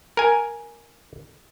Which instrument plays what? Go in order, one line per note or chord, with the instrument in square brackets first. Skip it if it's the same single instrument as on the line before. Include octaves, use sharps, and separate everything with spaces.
[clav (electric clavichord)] A#4 G#5